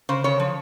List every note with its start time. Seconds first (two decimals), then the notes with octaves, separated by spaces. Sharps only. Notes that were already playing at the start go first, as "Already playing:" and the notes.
0.09 C#3 C5
0.24 C#3 C#5
0.40 F3